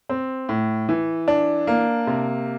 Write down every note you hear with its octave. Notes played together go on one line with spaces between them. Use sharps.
C4
A2
E3
D4
A#3
C3